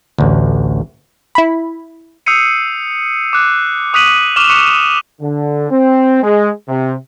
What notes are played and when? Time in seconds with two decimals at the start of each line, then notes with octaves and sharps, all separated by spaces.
0.18 A1 D2
1.35 E4 B5
2.26 D#6 E6 G6 C7 C#7 D#7
3.33 D6 F#6
3.93 C#6 D#6 F#6 B6 D#7 F#7
4.36 C#6 D6 F6 E7 F7 G7
4.50 C#6 D6 F#6 B6 C#7 E7
5.20 D3
5.71 C4
6.22 G#3
6.68 C3